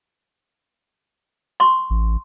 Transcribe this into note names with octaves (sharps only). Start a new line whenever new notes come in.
C6 C#6
A1